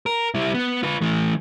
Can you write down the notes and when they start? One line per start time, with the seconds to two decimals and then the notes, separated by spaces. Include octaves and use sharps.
0.06 A#4
0.35 G3 E4
0.54 B3
0.83 F4 B4
1.01 E3 A3